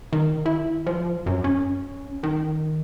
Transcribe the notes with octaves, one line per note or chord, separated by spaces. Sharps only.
D#3
E4
F3
F#2
C#4
D#3